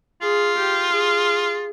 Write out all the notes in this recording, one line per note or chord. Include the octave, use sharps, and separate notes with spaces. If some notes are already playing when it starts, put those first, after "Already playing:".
F4 G#4
G4
G#4